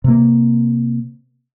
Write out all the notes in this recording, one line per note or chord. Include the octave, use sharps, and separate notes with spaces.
C3 A#3